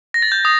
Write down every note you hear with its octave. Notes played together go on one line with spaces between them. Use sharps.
A#6
A6
G6
D#6